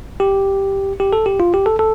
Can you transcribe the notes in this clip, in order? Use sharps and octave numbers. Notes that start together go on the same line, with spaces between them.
G4
G4
A4
G4
F4
G4
A4
A4